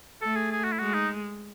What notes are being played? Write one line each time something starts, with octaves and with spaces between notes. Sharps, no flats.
A3 A4
G#4
G#4
F#4
E4
G#3 F#4
D#4